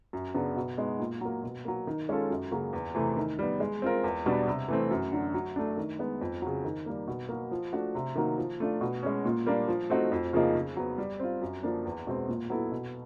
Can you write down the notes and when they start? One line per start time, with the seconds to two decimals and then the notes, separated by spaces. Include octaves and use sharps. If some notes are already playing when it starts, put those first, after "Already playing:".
0.13 F#2
0.34 C#3 F#3 B3 D4
0.56 B2
0.78 G#3 B3 D#4 G#4
0.99 A#2
1.21 F#3 A#3
1.43 B2
1.65 F#3 A#3
1.87 D#3
2.09 G#3 C#4 F4 A4
2.30 F#2
2.52 C#3 F#3 A#3
2.73 E2
2.95 C3 E3 A3
3.16 D#3
3.39 G3 B3
3.60 G#3
3.82 C4 F4 A#4
4.04 E2
4.26 B2 G3 B3 D4
4.48 C3
4.68 E3 A3 C4
4.91 F#2
5.12 D3 F#3
5.34 F#3
5.56 A3 D4
5.77 D#3
5.99 G#3 B3
6.21 F2
6.42 C#3 F#3
6.64 D#3
6.86 G3 A#3
7.07 B2
7.29 F#3 A#3
7.51 F3
7.73 A3 D4 F#4
7.95 C3
8.16 D#3 F#3 A#3
8.38 F3
8.60 A3 D4 F4
8.81 B2
9.03 G#3 C#4
9.25 A#2
9.46 G3 A#3 D4
9.68 F3
9.90 A3 C4 D#4 F#4
10.12 F2
10.33 C#3 F3 A#3 D#4
10.55 C#3
10.77 F#3 B3
10.98 G3
11.20 C4 F4
11.41 F#2
11.63 D3 F3 A#3 D4
11.85 E2
12.07 B2 G#3 C4
12.29 A#2
12.50 F#3 B3 E4 A4
12.72 B2